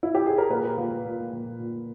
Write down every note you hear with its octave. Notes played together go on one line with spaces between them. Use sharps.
E4
G4
G#4
A#4
A#2 B4
A#2
A#2
A#2
A#2